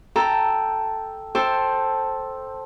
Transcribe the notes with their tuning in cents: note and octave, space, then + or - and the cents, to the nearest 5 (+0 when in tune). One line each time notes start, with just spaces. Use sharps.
A4 +0 G5 +0 A#5 +0
A4 +0 C5 +10 G5 +0